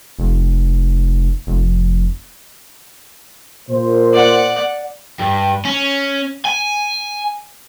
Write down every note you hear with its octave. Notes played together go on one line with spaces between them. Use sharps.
F1
F1
A#2 C5
D5 F#5
G2
C#4
G#5